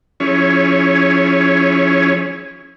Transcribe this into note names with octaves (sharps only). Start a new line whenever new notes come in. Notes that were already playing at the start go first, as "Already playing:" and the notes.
F3 C#4 E4 G#4 C#5